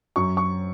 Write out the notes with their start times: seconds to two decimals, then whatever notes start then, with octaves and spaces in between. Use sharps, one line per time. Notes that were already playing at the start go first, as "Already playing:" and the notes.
0.16 F#2 C#6
0.37 C#6